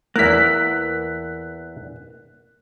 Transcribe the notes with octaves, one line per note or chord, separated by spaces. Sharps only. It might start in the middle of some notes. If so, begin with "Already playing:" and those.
E2 A#3 E4 A#4 F#6 B6